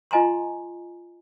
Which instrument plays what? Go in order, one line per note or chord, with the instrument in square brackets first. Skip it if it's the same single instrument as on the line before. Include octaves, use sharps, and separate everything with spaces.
[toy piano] F4 D#5 G#5 A#5 C6